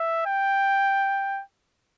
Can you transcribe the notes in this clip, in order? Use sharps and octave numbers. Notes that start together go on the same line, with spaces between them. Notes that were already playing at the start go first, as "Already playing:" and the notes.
Already playing: E5
G5